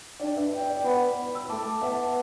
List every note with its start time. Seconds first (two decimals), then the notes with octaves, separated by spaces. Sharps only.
0.20 D4 D5 G5
0.36 B4 E5
0.52 D5 G5
0.68 D5 G5
0.84 B3 G5 B5
1.35 E6
1.49 A3 A5 D6
1.82 B3 E5 A5